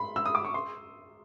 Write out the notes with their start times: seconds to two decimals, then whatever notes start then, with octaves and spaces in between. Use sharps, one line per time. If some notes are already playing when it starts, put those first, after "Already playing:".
Already playing: B5 C6
0.16 E6
0.26 D#6
0.35 D6
0.45 C#6
0.54 C6